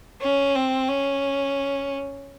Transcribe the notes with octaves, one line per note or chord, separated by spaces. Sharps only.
C#4
C4
C#4